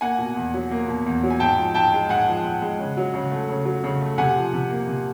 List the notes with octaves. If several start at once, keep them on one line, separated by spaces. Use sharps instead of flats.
A#3 F#5 G#5
B2
E2
F#3
A#3
B2
E2
F#3
G#5
G#2 G5 A5
F3
G#2 G5 A5
G#3
G#2 F#5 G#5
F3
G#2
G#3
C#3
F#3
C#3
A3
C#3
F#3
C#3
A3
C3 F#5 G#5
F3
C3
A#3
C3